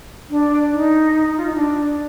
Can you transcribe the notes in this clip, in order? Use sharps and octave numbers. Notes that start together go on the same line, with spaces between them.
D4
D#4
F4
D#4
D4